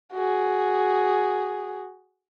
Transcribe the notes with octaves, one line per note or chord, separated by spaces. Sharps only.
F#4 G#4